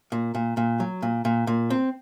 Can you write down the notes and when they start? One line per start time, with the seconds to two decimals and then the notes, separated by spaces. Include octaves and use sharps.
0.12 A#2
0.35 A#2
0.57 A#2
0.80 F#3
1.02 A#2
1.25 A#2
1.47 A#2
1.70 C4